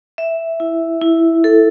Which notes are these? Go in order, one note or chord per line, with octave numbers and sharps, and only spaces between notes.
E5
E4
E4
A4